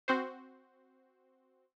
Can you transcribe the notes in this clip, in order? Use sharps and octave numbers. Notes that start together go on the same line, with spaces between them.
C4 F#4 C5